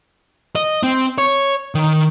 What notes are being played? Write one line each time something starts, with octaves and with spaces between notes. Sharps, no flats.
D#5
C4
C#5
D#3